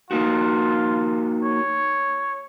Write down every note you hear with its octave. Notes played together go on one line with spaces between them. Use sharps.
A#3 D#4 F4 F#4
C#5